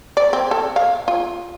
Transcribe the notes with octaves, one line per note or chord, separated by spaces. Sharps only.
D5
C4
A4
F5
F4